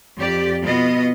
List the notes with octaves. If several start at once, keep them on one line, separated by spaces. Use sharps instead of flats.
F2 G4 D5
B2 B3 F4 D#5